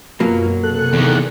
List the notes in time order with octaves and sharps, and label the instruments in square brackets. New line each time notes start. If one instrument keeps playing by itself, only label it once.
[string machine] F#2 [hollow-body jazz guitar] B2 F#3 A#3 [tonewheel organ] F4
[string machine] C3 G#4 C#7 [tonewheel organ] A4 F#6
[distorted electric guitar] E2 D#3